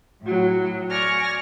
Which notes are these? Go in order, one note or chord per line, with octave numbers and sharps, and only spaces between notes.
A2 F#3
D5 G#5 C#6 F6 A#6